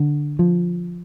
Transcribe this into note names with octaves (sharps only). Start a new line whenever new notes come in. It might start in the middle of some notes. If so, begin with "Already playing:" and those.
Already playing: D3
F3